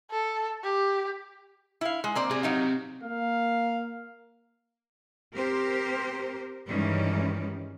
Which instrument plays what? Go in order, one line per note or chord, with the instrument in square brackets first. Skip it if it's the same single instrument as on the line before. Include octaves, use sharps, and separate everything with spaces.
[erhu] A4
G4
[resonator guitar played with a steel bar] E4 F5
G#3
A#3 C4 D5
[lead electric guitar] C3 [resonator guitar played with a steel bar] G#4
[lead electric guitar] C3 [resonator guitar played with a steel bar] F#3 D#4 F5
[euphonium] A#3 [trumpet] F5
[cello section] C4 G4 A#4 C5
G2 D#3 E3 G3 G#3 C#4